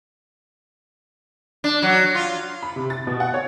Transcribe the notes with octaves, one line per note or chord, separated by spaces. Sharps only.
D4
F#3
F4
B5
C3
A6
B2
F#5
C#5